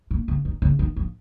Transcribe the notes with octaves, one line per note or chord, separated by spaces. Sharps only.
A#2
C#3
D#3
C#3
D#3
F3